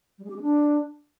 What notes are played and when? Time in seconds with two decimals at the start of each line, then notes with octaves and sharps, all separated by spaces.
0.18 G3
0.24 G#3
0.30 G4
0.36 G#3
0.42 D4